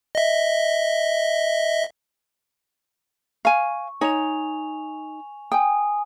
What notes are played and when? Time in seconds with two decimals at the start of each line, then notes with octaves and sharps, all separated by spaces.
0.15 D#5 E5
3.45 F5 G#5 C#6
4.01 D#4 C#5 G#5 F7
5.52 G5 G#5 D#6